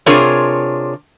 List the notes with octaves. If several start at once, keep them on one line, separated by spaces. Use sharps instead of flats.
C3 D4 F4 G#4 A#4 C#5